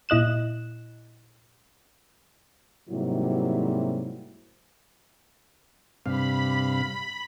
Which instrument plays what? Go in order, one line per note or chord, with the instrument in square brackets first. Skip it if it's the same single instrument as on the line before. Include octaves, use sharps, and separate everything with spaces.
[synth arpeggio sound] A#2 E4 D#5 F#6 E7
[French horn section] G#2 C3 F#3 G3 A#3 E4
[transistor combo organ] G2 C3 F5 [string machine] B5